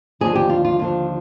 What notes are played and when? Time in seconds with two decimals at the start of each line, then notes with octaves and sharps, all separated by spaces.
0.21 D#2 D3 F3 G#4
0.36 G4
0.49 F4
0.65 F4
0.79 D#2 D3 F3 F4